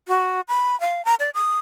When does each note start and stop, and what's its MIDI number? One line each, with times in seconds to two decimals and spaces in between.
0.08 0.41 66
0.48 0.79 83
0.80 1.04 77
1.05 1.15 82
1.20 1.30 74
1.34 1.59 87